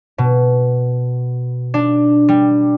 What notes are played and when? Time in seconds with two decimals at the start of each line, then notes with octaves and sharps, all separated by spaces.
0.18 B2
1.74 D4
2.29 G3